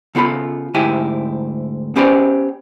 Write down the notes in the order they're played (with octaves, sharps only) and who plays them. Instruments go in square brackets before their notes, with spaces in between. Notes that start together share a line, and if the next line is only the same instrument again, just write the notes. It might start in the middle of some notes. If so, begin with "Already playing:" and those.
[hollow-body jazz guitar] C#3 B3 F4 A4 B5
D2 G#2 E4 G4 G#5
B3 C#4 G4 B4 C5 D5